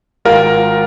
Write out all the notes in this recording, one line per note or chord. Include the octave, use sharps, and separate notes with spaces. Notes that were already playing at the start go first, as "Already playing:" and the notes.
G#1 F4 A#4